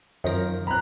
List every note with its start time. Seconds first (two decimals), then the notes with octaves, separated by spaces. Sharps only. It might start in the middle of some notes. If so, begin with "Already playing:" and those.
0.24 F#2 D#3 F3 A#4 A#6
0.67 B1 C4 A#5 B5 F#6